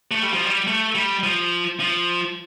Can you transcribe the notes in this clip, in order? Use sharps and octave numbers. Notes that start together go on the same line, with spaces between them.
A3
G3
F3
G3
A3
G3
F3
F3